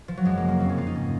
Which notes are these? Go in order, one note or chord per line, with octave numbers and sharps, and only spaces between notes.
F3
F#3
F#2 G#3
A#3
C#3
A#3
F2 C4
C#4
C#3 F4
D#4
G#2 C#4